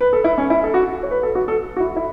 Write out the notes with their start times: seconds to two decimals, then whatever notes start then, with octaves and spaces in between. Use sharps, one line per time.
0.01 B4
0.13 A4
0.24 E4
0.38 C#4
0.50 E4
0.64 A4
0.74 F#4
1.03 C#5
1.11 B4
1.23 A4
1.35 F#4
1.48 A4
1.77 F#4
1.80 E4
1.96 E4